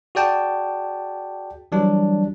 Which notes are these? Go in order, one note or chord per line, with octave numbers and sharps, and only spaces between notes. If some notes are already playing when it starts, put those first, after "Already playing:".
F#4 G#4 D5 G5 A5
E3 F#3 G3 D4